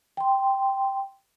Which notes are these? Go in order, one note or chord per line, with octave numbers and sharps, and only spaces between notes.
G5 C6